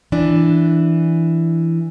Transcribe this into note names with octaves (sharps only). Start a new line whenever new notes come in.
E3 D4